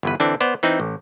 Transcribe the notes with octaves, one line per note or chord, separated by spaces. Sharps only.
G1 E2 B4
D3 E3 C4 D4
B3 C5 D5
E3 C4 D#4
A1